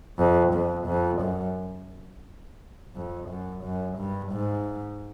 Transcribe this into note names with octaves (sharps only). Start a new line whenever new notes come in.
F2
F2
F2
F#2
F2
F#2
F#2
G2
G#2